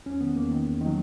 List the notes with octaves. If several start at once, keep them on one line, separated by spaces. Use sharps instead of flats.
E2 C#4
D#3 B3
E2 A#3
D#3
E2
D#3
F#3